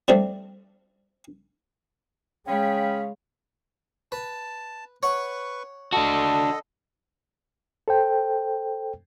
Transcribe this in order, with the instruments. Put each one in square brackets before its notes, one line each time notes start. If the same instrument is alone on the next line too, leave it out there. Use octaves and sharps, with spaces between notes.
[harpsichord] F3 G3 A3 C4 D4
[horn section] C#3 C#4 B5 [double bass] G#3 [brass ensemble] C#5 F5 [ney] G5
[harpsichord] B4 [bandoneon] A5
[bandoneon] B4 C#6 [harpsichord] C#5 F#5
[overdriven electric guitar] D4 F#4 [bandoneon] A4 D#5 [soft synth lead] A5
[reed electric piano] A4 C5 G5